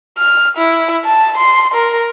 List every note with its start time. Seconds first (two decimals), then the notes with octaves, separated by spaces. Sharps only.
0.18 F6
0.58 E4
1.05 A5
1.38 C6
1.74 A#4